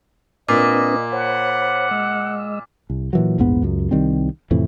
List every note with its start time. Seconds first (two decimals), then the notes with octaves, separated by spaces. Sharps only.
0.48 A#2 C4 D4 B4 D#5 D6
1.13 C5 C#5 F#5 B5
1.91 G#3 D#5 E6
2.90 C2
3.13 A#2 E3 F#3
3.38 A#1 E2 G#2 B3
3.62 C#2 F#2
3.91 C2 D#3 G3 C4
4.51 F2 A2 C3 E3